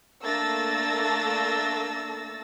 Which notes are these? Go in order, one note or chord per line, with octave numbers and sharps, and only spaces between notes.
A3 A#3 D4 E6 A6 A#6